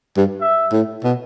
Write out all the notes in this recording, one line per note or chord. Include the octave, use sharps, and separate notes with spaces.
G2
E5
A2
B2